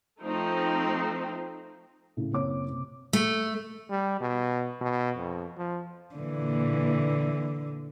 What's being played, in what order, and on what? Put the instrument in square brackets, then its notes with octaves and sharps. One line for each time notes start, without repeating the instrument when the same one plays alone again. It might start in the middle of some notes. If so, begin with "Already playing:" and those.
[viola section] F3 A3 C4 D#4 C5
[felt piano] A2 C#3
F#1 A#3 C4 C#5 D6
C3
[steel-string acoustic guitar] A3
[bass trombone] G3
B2
B2
F2
F3
[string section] A#2 E3 [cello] D3